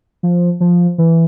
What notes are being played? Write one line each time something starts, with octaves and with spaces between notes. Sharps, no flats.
F3
F3
E3